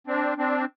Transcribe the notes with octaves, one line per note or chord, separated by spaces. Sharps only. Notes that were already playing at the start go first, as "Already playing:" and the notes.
C4 D4
C4 D4